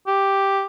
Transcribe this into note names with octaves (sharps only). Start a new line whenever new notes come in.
G4